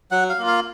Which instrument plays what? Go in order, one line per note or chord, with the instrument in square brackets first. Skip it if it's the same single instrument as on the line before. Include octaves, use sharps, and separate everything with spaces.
[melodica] F#3 F#5
F5
A#3 F4
F5